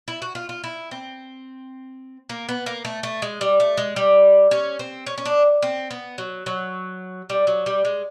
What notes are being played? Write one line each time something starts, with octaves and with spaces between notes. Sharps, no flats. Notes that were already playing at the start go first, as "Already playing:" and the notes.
E4
F#4
F4
F4
E4
C4
A#3
B3
A#3
A3
A3
G#3
G3
A3
G#3
G3
C#4
C4
C#4
C#4
D4
C4
B3
F#3
F#3
G3
F#3
G3
G#3